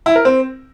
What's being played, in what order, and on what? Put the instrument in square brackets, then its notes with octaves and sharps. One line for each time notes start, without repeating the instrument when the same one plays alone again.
[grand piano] E4
A#4
C4